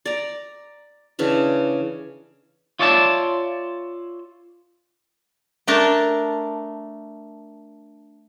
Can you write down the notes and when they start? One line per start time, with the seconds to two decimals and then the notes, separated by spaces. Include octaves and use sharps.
0.05 D5 A#5
1.19 C#3 E3 D4
2.79 F4 C#5 D5 E5 F#5 A5
5.67 A3 D4 A#4 A5